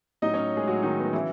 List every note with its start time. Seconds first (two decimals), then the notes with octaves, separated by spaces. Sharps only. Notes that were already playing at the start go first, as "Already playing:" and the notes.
0.22 A2 F#3 D#4 D#5
0.34 C#4 C#5
0.57 G#3 G#4
0.68 A2 F#3 F#4
0.83 D#3 D#4
0.99 B3
1.13 C#3 E3 F#3 E4